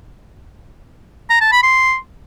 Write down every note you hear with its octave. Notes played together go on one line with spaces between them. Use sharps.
A#5
A5
B5
C6